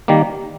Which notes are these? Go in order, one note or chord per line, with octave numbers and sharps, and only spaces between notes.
D#3 G3 A#3